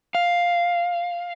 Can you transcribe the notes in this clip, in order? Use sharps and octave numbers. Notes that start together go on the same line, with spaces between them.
F5